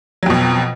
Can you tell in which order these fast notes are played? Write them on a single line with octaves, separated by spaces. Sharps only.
F#3 F2 B2